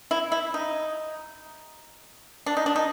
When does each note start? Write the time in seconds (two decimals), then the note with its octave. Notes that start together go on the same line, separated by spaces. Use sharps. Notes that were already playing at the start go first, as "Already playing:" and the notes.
0.11 E4
0.32 E4
0.54 D#4
2.46 D4
2.57 D#4
2.66 D4
2.76 D#4